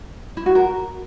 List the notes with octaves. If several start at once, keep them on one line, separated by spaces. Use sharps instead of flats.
E4
F#4
A#4